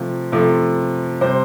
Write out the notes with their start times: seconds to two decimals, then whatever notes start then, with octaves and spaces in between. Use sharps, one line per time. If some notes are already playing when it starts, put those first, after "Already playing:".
Already playing: C3 F3 A3
0.32 C3 F3 A3
1.21 C3 G3 C5